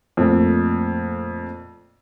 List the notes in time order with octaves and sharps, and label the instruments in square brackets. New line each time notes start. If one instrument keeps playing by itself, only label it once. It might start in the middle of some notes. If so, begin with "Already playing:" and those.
[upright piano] F2 A#2 A3